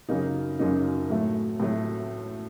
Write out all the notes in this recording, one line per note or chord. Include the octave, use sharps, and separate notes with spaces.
F#2 C#3 F#3 A#3 D#4
F#2 C#3 F#3 A#3 D#4
A2 F#3 A3
A2 F#3 A3